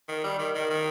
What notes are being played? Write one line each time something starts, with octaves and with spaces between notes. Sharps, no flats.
D#3
G3
D#3
D#3
D#3